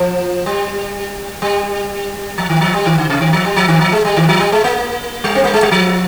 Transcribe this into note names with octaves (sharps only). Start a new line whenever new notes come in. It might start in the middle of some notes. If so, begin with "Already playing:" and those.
Already playing: F3
G3
G3
F3
D#3
F3
G3
D#3
D3
C3
D#3
F3
G3
F3
D#3
F3
G#3
G3
D#3
F3
G3
G#3
A#3
G3
C4
A#3
G#3
G3
F3